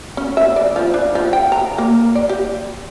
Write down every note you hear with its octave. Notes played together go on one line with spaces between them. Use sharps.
C#4
E5
D5
F3
D4
F3
G5
A#5
A#3
D5
G4